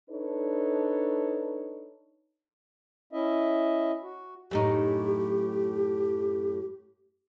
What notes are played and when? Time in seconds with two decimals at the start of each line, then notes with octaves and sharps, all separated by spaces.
0.10 D4 D#4 A4 B4 C#5
3.13 C#4 E4 D#5 E5
4.02 F#4
4.51 F#2 A2 D#4 G4